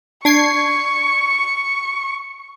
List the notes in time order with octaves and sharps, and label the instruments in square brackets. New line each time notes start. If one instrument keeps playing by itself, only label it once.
[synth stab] D4 G#6 C7 [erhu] C#6